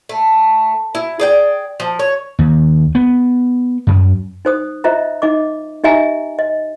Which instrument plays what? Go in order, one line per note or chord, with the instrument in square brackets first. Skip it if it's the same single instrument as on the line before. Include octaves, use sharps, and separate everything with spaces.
[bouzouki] A3
E4
G#4 D5 G5
F3
C#5
[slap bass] D#2
B3
F#2
[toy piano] D#4 C5 D#6
F4 C5 D#5 E5 A#5
D#4 D#5 D6
D#4 G4 D#5 E5 G#5 A#5
D#5